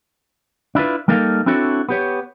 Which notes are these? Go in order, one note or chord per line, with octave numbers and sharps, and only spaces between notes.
D4 E4 F4 B4
G3 A#3 D#4 A4 A#4 F5
C4 D4 E4 F#4 A4 C#5
B3 G4 C#5